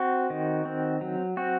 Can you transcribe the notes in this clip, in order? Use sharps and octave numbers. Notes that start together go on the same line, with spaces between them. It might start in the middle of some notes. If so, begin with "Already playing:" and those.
Already playing: C4 F#4
D#3
C4
F#3
C4 F#4